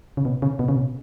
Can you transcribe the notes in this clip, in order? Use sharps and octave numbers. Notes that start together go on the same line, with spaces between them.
C#3
B2
C#3
B2
C#3
B2